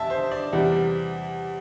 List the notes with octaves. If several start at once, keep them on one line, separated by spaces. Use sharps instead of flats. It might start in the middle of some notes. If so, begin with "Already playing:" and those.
Already playing: E2 G3 E5 A5
C5
D5
E2 C3 G3